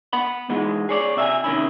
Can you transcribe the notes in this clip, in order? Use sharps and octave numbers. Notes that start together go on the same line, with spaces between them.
B3 F#5 B5
G#2 E3 G#3
G#4 C#5 D5
C3 E5 F5 G#5
C3 D#3 C#4 E4